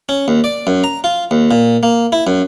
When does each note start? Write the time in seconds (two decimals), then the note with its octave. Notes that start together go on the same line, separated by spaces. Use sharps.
0.09 C#4
0.28 D#2
0.44 D5
0.67 F#2
0.84 A#5
1.04 F4
1.31 D#2
1.51 A#2
1.83 A#3
2.12 E4
2.27 F#2